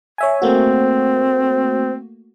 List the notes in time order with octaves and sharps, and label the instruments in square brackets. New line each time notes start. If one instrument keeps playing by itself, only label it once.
[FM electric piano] C#5 E5 G#5
[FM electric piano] A3 A#3 F#4 [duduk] C4 [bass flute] C5